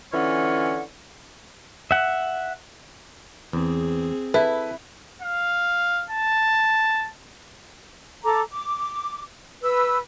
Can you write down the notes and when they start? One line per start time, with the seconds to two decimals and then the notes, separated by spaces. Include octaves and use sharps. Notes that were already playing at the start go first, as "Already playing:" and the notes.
0.13 D3 E3 C#4 F4 C#5 F#5
1.91 E5 F#5
3.53 E2 C4 G#4
4.34 E4 A4 B4
5.22 F5
6.10 A5
8.24 A4 A#5 D6
8.52 D6
9.62 B4 E6